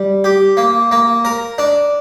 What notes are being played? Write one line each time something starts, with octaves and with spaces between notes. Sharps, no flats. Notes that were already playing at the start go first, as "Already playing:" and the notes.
Already playing: G3
G4
A#3
A#3
A#4
D4